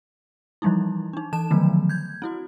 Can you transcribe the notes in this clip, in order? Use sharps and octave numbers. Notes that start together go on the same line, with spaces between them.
E3 F3 G3 D#4 E4
D4 D#4
E3 A4 A5 E7
D3 D#3 F3 F#3 A3 B3
G6 G#6
C4 E4 F#4